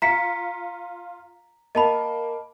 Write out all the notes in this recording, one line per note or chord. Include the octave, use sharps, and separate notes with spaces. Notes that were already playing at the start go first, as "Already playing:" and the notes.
F4 A#5 B6 C#7
A#3 D#5 A5 B5